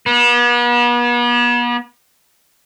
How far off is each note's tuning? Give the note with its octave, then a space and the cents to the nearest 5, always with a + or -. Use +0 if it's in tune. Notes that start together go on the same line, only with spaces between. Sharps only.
B3 -40